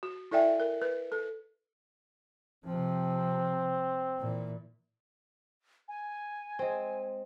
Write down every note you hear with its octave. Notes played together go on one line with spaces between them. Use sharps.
F#4
E4 A4 D5 E5 G5 G#5
A#4
B4
A4
C3 F3 C4
A#2 E3
G#5
G#3 C4